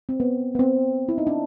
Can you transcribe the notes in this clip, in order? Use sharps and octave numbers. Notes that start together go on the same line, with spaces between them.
C4
B3
B3
C4
E4
D#4
D4